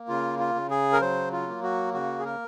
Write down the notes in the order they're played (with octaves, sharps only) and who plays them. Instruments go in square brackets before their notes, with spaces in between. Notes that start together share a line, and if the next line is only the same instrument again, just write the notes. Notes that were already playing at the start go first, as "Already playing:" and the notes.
Already playing: [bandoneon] A#3
C#3 F4
F4
C#3
G#4
A#4
F#3 C5
F4
A#3
F#4
C#3 F#4
G#4
A#4